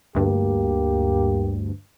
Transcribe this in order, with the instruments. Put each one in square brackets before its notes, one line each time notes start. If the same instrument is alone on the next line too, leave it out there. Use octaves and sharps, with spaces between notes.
[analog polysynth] D2 G2 [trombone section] A#3 G4